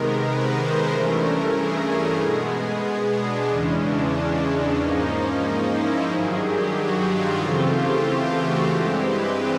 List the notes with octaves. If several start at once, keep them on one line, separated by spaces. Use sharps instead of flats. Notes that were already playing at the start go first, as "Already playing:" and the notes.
Already playing: C3 D#3 G#3 B3 A#4
B4
C5
G2 E3 A3 C#4 A#4
G#4
G#4
B2 G#3 B3
D4
E2 C#3 E3 G#3 C#4
D4
C#4
D4
G#2 F3 A#3 C#4 D#4
E4
G2 D#3 F#3 G#4
G4
F#4
F4
C#3 E3 A3 C4 F4
G4
F#4
G2 E3 G#3 C4 G4
B4